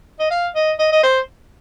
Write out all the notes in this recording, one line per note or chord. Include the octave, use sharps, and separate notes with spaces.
D#5
F5
D#5
D#5
D#5
C5